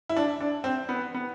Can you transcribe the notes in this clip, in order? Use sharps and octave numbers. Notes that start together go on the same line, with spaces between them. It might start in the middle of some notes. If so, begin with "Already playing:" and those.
E4
D4
D4
C4
B3
B3